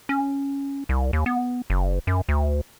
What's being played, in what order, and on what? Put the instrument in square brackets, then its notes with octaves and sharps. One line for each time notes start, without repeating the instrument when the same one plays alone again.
[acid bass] C#4
C2
D#2
B3
F#1
F#2
D2